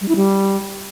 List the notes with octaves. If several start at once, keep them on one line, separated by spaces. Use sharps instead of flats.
G3
E4
G3